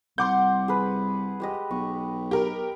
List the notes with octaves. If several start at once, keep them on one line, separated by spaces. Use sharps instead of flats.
C2 F#5 C6 D6 G6
G#4 B4
G#3 G4 D#5
B1 C#6
G4 A#4